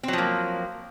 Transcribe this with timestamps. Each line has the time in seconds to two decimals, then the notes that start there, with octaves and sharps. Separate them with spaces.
0.03 C4
0.08 F#3
0.13 F3
0.18 A#3